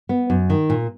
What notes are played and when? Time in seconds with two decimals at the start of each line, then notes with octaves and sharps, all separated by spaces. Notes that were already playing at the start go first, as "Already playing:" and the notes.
0.09 B3
0.30 F#2
0.50 D#3
0.70 A#2